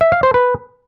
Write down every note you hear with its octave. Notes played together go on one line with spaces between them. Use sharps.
E5
F5
C5
B4